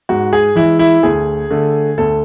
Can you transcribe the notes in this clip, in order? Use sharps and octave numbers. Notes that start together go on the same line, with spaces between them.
G#2 F#4
G#4
E3 G#3 E4
E4
D2 G#4
D3 A3
D2 A4